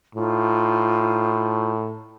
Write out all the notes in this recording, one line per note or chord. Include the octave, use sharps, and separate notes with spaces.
A2 D#4 F4 C5